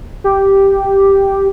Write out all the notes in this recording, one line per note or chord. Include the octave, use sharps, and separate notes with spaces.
G4